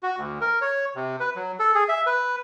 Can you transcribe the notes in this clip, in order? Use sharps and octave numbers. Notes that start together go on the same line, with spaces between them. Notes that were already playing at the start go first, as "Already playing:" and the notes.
F#4
D2
A#4
C#5
C3
B4
F#3
A4
G#4
E5
B4